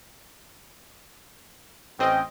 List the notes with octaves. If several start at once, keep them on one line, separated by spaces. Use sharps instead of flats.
A1 C4 C#4 D#5 G5